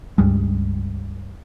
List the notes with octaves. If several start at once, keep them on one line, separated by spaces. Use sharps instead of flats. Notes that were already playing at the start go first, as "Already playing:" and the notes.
C#2 G2 G3 G#3